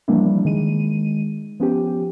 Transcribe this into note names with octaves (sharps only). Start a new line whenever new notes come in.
E3 F3 G3 A#3 D4 E4
D#3 G#3 D#7
F3 B3 C#4 G4